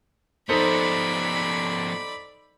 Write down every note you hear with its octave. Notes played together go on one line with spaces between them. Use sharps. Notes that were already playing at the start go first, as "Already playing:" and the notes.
F3 B3 D#4 A4 C5 D5 B5